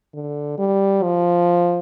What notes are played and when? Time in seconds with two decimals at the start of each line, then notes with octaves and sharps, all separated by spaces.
0.14 D3
0.58 G3
1.03 F3